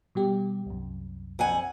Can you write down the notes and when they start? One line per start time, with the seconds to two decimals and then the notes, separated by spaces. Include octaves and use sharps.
0.15 B2 G3 G4
0.66 C2 F#2
1.39 F2 F#5 G#5